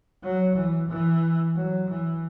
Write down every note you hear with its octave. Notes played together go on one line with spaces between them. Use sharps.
F#3
E3
E3
F#3
E3